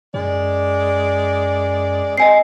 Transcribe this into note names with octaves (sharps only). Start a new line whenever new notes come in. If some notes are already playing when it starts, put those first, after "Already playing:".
F#2 G#3 D5
C4 D#5 G#5 C7